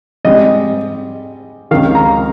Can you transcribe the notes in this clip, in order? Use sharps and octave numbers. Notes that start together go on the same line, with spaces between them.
G#2 G3 C4 D#5
C#2 C3 D#3 F5
A#5